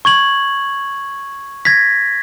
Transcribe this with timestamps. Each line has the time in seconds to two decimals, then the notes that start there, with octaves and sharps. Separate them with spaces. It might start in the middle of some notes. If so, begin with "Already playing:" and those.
0.05 C#6 G#6 F#7
1.65 G#6 A#6 B6